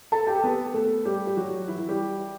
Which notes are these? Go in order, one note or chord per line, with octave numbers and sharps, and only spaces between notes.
A4 A5
G4 G5
A4
B3 B4
A3 A4
G3 G4
G4
F#3 F#4
E3 E4
E3 E4
G3 G4